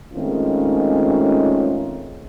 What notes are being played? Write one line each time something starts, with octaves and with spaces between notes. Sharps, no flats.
D#3 G#3 A3 C4 C#4 F4